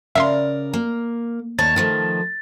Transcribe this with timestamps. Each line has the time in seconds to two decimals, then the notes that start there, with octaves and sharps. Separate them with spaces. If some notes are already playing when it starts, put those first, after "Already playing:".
0.15 C#3 A#4 D5 E5 F5 C6
0.74 A#3
1.59 D#2 C#5 A5 A6
1.76 D#3 F3 A3